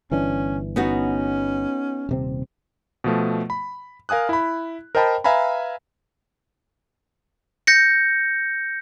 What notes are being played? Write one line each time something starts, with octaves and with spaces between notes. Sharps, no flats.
G1 E3 C#4 D4
B3 C#4 D#4 F#4
D#1 C3 C4
B2 F3 A3
B5
A#4 F5 G#5 D#6 F#6
E4 B5
A#4 C5 D#5 G5 A5 B5
B4 E5 F5 G#5 A#5 B5
G6 A#6 C#7